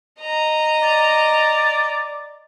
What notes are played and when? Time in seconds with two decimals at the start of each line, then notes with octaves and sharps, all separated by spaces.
0.20 D#5 A#5
0.83 D5